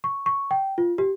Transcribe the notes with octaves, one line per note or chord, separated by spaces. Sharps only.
C#6
C#6
G5
F4
G4